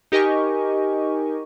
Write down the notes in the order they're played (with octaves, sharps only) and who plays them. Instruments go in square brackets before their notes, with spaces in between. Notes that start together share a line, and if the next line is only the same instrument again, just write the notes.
[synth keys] D#4 G4 A#4 D#5 G#5 C#6